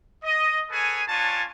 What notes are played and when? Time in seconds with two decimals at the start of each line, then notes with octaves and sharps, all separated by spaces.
0.24 D#5
0.71 G#4 A4 B4 C#5 G#5
1.08 C#4 D4 F4 C#5 G#5 A5